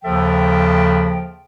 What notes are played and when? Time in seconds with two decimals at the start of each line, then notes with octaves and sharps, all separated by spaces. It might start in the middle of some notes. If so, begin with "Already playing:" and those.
0.04 D#2 C#3 F3 A4 E5 G5